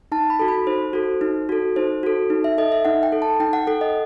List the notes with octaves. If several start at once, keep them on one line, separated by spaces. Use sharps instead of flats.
D#4 A5
B5
F#4 A4
B5
D#4 C5
F#4 A4
D#4
F#4 A4
D#4 C5
F#4 A4
D#4
E5
A4 D#5
E5
D#4 F#5
G5
A4
A5
D#4 G5
F#5
A4 F#5
D#5